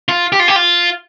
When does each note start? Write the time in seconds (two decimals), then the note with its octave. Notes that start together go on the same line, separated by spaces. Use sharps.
0.09 F4
0.32 G4
0.40 F4
0.48 G4
0.56 F4